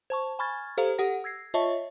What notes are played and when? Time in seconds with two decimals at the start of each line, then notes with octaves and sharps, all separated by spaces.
0.10 C5 A5 C#6
0.39 G#5 B5 C#6 F6 G#6 A6
0.77 G4 A4 C5 F5 A#5
0.98 G4 A4 F#5 A#6
1.24 E6 G#6 A#6 C7
1.54 F4 C#5 D#5 E5 A5 C#6